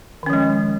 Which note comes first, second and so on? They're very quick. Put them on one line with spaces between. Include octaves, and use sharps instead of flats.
D#3 C#4 F3 G#3